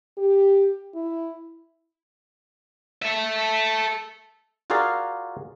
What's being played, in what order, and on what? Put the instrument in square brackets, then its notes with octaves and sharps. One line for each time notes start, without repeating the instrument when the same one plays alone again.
[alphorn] G4
E4
[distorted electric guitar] A4 E5
[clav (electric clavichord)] F4 F#4 G#4 A#4 D5 F5